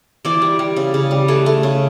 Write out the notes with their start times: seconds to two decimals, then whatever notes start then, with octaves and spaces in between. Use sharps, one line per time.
0.25 E3 C5 D5
0.42 G3
0.59 G3
0.76 C#3
0.94 C#3
1.11 G3
1.28 A3 B4 C#5
1.46 A3
1.63 C#3